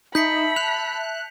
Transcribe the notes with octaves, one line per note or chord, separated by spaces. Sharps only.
D#4 E5 A5 B5 G6 B6 C#7
F#6 F7